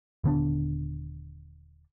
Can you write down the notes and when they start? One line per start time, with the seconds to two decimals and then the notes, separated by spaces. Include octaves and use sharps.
0.24 D#1 D3 B3 D4